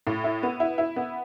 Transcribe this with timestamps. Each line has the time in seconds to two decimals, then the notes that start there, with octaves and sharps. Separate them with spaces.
0.07 A2
0.24 E4
0.43 B3
0.60 E4
0.78 E4
0.96 B3